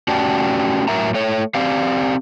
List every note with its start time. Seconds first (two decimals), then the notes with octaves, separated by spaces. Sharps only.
0.08 A3 C#4 F#4 G4 D5 A5
0.88 A2 F#3 A#4 E5 A#5
1.14 A3 C#5
1.55 C4 G4 D5 F5